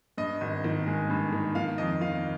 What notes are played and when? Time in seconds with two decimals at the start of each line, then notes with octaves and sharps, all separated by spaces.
0.18 G2 D#5
0.41 G#1
0.64 D#3
0.87 G#3
1.10 G2
1.33 D#3
1.55 D#3 F5
1.78 F2 D#5
2.01 D#3 F5